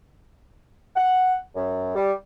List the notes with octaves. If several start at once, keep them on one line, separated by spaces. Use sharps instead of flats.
F#5
F#2
G3